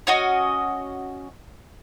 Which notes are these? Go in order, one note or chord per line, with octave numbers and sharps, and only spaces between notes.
C#4 F#4 D#5